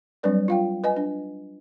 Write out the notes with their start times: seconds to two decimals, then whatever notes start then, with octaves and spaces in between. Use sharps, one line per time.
0.23 F#3 G3 C4 D4 B4 D5
0.48 F4 F5 G5
0.84 B4 D#5 G#5
0.96 D4